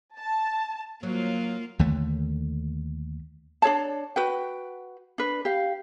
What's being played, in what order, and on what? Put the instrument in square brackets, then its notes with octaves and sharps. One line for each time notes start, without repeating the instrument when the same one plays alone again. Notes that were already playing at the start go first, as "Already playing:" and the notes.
[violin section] A5
[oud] F#3 [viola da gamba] A#3 F4
[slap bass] D#2 D3 A3
[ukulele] D4 G#4 C#5 A5
F#4 B4 G5
D4 B4
G4 F5